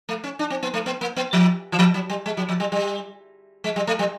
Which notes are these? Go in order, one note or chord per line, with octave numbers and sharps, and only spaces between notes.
A3
C#4
D4
C4
B3
A3
B3
A#3
B3
F3
E3
F3
F#3
G3
G#3
F#3
F3
G3
G3
G#3
G3
A3
G3